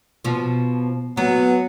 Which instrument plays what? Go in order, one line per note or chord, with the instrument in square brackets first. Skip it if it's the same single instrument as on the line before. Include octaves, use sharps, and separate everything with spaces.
[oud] B2 F3
[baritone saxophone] F#3 [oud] B3